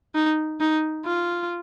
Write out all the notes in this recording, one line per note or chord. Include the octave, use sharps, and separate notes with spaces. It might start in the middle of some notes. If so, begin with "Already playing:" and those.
D#4
D#4
F4